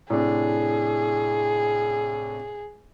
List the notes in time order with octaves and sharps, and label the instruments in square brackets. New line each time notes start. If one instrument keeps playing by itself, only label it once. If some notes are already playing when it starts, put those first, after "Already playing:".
[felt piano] A2 C3 D4 [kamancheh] G#4